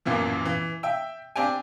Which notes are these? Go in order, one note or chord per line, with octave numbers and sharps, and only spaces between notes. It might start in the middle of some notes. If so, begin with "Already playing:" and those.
A1 F#2 A#2 E3 F3
E3
E5 G5 E6
C4 D4 G4 G5 G#5